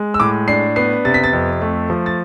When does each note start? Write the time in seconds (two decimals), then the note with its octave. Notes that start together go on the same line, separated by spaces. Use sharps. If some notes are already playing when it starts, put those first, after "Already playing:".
Already playing: G#3
0.14 E6
0.20 A2 D6
0.48 D4 C7
0.76 B3 C7
1.05 C3 A6
1.14 B6
1.24 A6
1.33 F2
1.62 A3
1.90 F3
2.06 A6